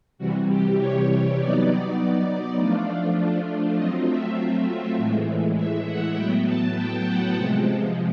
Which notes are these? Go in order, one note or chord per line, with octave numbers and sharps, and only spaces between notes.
C3 E3 G3 F#4
G4
C#5
F#3 B3 D#4 D5
F3 A3 D4 F4
F#3 A3 C4 F4 D#5
E5
E5
A2 E3 G#3
E5
F#5
A2 F#3 B3 G5
A5
G5
F#5
C3 F3 G#3